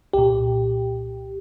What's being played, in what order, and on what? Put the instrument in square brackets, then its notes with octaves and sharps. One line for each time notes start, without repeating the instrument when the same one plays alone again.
[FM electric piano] C2 A#2 G4